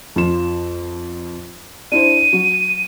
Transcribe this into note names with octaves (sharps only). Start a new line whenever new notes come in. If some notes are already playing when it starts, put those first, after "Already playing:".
F2 F4 E7
D4 E4 C5 D#7
F#3